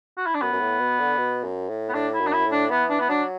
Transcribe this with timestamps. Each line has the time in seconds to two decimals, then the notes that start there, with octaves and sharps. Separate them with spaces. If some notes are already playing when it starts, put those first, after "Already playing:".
0.18 F#4
0.26 E4
0.35 D4
0.42 F#2 B3
0.53 F#2
0.61 A2
0.80 B2
1.00 D3
1.18 B2
1.44 F#2
1.69 A2
1.89 B3
1.94 A2 D4
2.14 E4
2.20 F#2
2.27 D4
2.33 E4
2.46 A2
2.52 D4
2.71 E3 B3
2.90 D4
3.00 B3
3.09 F#3 D4